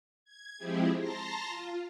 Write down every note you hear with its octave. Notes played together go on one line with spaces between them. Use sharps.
G#6
F3 G#3 C4 E4 G4 G#4
A5 A#5 C6 A#6
F4